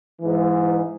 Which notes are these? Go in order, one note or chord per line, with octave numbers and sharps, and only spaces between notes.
G#2 E3